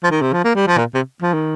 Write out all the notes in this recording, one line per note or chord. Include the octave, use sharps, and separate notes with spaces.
F3
D#3
C3
F3
A#3
G3
F3
A#2
C3
F3
D#3